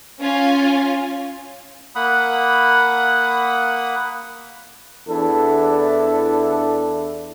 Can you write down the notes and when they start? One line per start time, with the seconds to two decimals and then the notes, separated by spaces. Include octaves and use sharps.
0.21 C#4 F4 G#5
1.95 A#3 F#5 B5 D#6
5.08 E2 D4 E4 A4